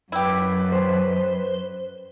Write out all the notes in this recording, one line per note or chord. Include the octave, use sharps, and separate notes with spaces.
F#2 E4 G4 B4
C5